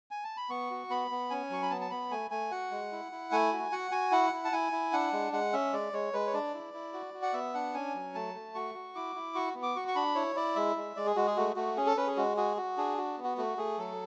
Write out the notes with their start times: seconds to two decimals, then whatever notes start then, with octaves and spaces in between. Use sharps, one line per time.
0.11 G#5
0.24 A5
0.37 B5
0.50 B3 C#6
0.70 F#4
0.90 B3 B5
1.11 B3
1.30 C#4 G#5
1.50 F#3 C#6
1.63 B5
1.70 B3 A5
1.81 A5
1.91 B3 B5
2.11 A3 G#5
2.31 A3 G#5
2.51 F#4 F#5
2.71 G#3
2.92 E4
3.12 E4
3.31 A3 G#5
3.52 F#4
3.72 F#4 F#5
3.91 F#4 G#5
4.12 E4 F#5
4.33 E4
4.45 A5
4.52 E4 G#5
4.72 E4
4.93 D4 F#5
5.13 G#3
5.32 G#3 F#5
5.53 C#4 E5
5.73 G#3 D5
5.93 G#3 C#5
6.14 G#3 B4
6.27 C#5
6.34 D4 D5
6.54 E4
6.74 E4
6.93 F#4
7.14 F#4
7.22 F#5
7.34 B3 E5
7.54 D4 F#5
7.74 C#4 G#5
7.95 F#3
8.15 A3 A5
8.34 A3
8.55 F#4 C#6
8.75 F#4
8.95 E4 D6
9.16 E4
9.35 F#4 C#6
9.55 B3
9.63 D6
9.76 F#4 C#6
9.88 C#6
9.95 D4 B5
10.15 E4 C#5
10.36 E4 D5
10.56 G#3 E5
10.76 G#3
10.96 G#3 D5
11.06 G#4
11.16 G#3 F#4
11.27 G#4
11.36 A3 F#4
11.56 A3 F#4
11.77 C#4 G#4
11.86 A4
11.97 C#4 B4
12.07 G#4
12.17 G#3 F#4
12.37 F#4 G#4
12.57 F#4
12.77 D4 G#4
12.98 F#4
13.18 B3
13.24 F#4
13.38 A3 F#4
13.58 A3 G#4
13.78 F#3 A4